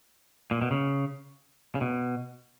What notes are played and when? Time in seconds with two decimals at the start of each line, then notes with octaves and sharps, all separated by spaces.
0.51 A#2
0.62 B2
0.71 C#3
1.75 C#3
1.81 B2